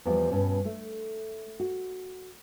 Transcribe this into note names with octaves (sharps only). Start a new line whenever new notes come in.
E2 F3 G3 D5 F#5
G2 B2 C#4
A3
F#4